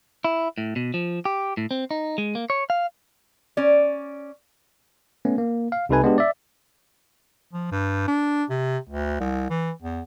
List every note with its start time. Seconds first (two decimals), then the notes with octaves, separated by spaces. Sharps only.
0.24 E4
0.58 A2
0.76 B2
0.94 F3
1.25 G4
1.57 A2
1.71 C4
1.91 D#4
2.18 G#3
2.35 A#3
2.50 C#5
2.70 F5
3.57 C#4 D5
5.25 A3 B3 C#4
5.38 A#3
5.72 F5
5.89 C2 C3 D#4 A4 B4 G#5
6.03 G#3 B3 D4 G4
6.18 D5 E5
7.53 F3
7.71 G2
8.08 D4
8.50 C3
8.89 D2
9.20 C2
9.50 E3
9.82 E2